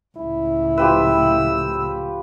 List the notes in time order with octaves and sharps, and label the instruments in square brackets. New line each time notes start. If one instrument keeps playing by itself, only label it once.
[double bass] C#2 A2 [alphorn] E4
[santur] F3 G4 B4 [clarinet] E6